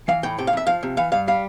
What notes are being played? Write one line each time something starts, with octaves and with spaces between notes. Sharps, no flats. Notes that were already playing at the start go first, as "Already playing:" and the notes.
E3 F5
A2 G5
C3 G5
F5
F2 E5
F3 F5
C3
E3 F5
G2 F5
G3 F5